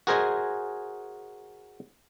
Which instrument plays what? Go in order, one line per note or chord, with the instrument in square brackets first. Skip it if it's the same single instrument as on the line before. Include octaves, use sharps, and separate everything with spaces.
[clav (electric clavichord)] F#4 G#4 A#4 C5 D#5 G#5